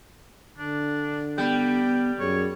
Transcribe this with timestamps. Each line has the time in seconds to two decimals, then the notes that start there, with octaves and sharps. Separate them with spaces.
0.58 D3 D4
1.38 G3 B3 G5
2.20 F#2 G#4 C#5